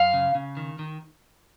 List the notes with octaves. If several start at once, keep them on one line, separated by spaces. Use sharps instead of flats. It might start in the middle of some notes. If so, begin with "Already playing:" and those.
Already playing: F#2 F5
C#3
C#3
D#3
D#3